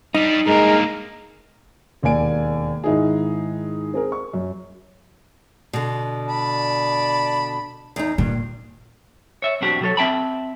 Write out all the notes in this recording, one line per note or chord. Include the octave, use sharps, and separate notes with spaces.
G3 D4 D#4
G2 G#3 A#3 A#4
E1 D#2 A#3 D5 G#5 D7
G#2 D#3 D#4 E4 G#4
C4 G#4 A#4
C#6
F#2
B2 D3
D5 A5 B5
E2 D#4
G2 A#2
C#5 E5
B1 E2 C4 D4 F#4 G4
B2 F#3 A4 C#5
C4 E5 G5 A5 B5